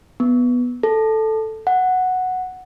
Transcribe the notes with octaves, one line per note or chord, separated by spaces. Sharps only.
B3
A4
F#5